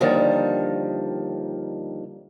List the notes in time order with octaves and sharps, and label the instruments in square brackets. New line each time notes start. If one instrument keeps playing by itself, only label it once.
[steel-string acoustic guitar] D#2 D3 D#3 F3 G3